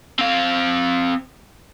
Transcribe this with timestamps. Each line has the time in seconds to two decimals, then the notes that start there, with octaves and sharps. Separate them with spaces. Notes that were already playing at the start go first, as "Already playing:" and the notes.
0.19 C4 F5